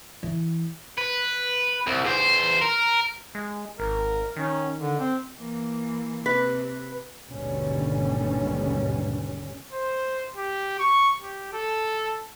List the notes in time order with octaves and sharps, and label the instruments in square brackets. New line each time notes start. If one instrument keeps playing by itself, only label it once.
[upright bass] E3
[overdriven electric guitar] B4
C2
E2 C5
A#4
[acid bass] G#3
[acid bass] G#1 [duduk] A#4
[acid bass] D#3 [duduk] C#4
[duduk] D3
C4
[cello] E3 A#3
[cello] C3 [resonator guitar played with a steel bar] B4
[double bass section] G#1 D#2 B2 D3 G3 C#4
[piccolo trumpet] C5
G4
C#6
G4
A4